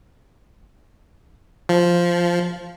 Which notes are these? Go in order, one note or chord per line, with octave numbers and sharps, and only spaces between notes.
F3